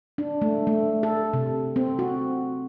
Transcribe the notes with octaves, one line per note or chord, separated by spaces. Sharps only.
D4
A3
A3
A4
C3
C4
F#4